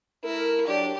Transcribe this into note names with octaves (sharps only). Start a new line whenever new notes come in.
A3 E4 A4 A#4
F#3 D4 G4